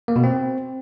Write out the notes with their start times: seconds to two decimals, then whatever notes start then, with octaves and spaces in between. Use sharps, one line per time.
0.08 A#3
0.16 B2
0.24 C4